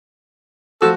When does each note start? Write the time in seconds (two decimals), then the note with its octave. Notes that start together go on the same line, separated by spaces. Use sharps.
0.82 F3 F#4 A4